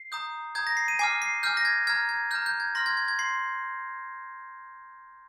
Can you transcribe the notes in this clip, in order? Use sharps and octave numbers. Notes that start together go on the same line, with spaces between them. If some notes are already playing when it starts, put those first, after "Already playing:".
Already playing: C7
A#5 D#6 G6
A#5 D#6 G6 G#6
A#6
C7
D#7
G#5 D6 F6 C7
C7
G#5 D6 F6 G6
A#6
G#6
A#5 F6 G#6
G#6
A#5 F6 G6
G6
G#6
C6 F6 A#6
G#6
G#6
G#6
C6 C7